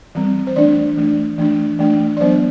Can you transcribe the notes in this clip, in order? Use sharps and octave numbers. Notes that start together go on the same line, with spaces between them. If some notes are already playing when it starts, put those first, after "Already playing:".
E3 G3 C4
C5
E3 A3 D4 D5
E3 A3 D4
E3 A3 D4
E3 A3 D4
D5
F#3 B3 D4 C5